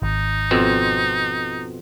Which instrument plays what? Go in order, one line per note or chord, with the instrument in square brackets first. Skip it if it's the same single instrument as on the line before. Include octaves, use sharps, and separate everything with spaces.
[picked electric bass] G#1 [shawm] D#4
[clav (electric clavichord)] F2 B2 C4